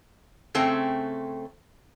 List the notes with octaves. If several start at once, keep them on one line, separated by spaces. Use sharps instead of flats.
C#3 A3 C4 C5 G5